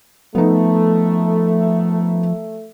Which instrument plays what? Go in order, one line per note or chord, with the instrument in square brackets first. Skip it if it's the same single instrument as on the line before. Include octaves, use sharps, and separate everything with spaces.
[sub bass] F3 [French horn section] A3 [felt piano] B3 D#4